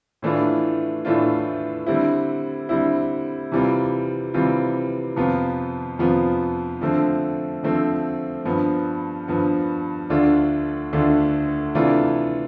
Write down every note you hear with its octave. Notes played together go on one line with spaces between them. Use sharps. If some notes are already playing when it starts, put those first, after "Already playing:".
A2 E3 A3 D4 F4
A2 E3 A3 D4 F4
D3 G3 C4 E4
D3 G3 C4 E4
C3 E3 G3 C4 F4
C3 E3 G3 C4 F4
F2 C3 F3 B3 F4
F2 C3 F3 B3 F4
D3 F3 A3 C4
D3 F3 A3 C4
G2 F3 B3
G2 F3 B3
D2 D3 A3 D4 F4
D2 D3 A3 D4 F4
C3 E3 A3 D4 F4